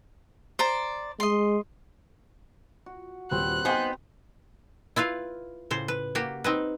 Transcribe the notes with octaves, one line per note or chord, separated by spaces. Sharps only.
C5 D5 A#5
G#3 D#5 C6
F#4
D#1 C4 B4 F#6
B3 D#4 C5 G5 G#5
E4 F4 B4 F5
A2 C#3 C5
B4
A#3 F#4 G4
C4 D#4 B4